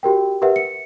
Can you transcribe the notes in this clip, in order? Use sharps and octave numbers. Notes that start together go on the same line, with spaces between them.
F#4 G4 A#4 G5
G4 A#4 B4 E5 F#5
C#7